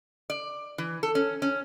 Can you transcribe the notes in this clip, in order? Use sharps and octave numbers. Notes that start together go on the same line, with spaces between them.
D5
E3
A4
C#4
C#4